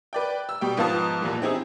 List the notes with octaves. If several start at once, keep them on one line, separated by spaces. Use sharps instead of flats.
B4 D5 G5
E6
B2 G3 G5
G#2 F3 B3 F5 A5 D#6
E2 A#2 E3 G3
C4 D#4 E4 G4 G#4